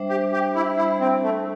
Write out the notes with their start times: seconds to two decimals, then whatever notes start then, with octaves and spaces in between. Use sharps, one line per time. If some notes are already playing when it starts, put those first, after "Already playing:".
Already playing: G3 D4 C5 E5
0.09 G4
0.32 G4
0.55 E4
0.77 G3 D4 E4 C5 E5
1.01 C4
1.23 A3